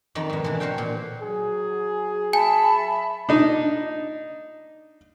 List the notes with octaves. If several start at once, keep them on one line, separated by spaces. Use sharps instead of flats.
F2 D#3 D5
G#2 B2
D3 E3
F#4 C5 F5 G5
A#2
F#3 G#4
E5 G#5 A5 B5
D4 D#4